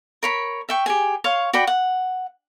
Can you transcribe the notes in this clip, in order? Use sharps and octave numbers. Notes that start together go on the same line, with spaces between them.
A#4 C#5 B5
E5 G5 C#6
G4 G#4 G#5
C#5 F5 C6
F#4 D5 G5 B5
F#5